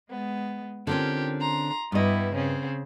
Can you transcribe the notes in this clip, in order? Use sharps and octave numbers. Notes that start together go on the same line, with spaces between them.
G#3 B3
D3 C4 C#4 F4 G4 A#4
A#5 C6
G2 G3 B3 E4 D#5
C#3 C4 C#4